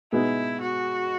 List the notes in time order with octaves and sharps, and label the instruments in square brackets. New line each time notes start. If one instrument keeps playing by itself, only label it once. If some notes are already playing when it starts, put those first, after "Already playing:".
[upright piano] B2 G#3 B3 D#4 [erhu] E4
[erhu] F#4